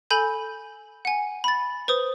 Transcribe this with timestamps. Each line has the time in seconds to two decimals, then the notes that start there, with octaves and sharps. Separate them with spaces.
0.11 A4 G#5 B5 G6 F#7
1.05 F#5 G#5
1.44 B5 A6
1.88 B4 C5 D#6